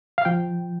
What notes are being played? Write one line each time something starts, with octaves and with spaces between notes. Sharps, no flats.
F5
F3 G5